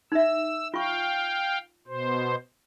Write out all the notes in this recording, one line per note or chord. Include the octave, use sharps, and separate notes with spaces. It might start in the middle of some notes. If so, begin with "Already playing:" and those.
D#4 E5 E6
F4 F5 G5 C#6
B2 C5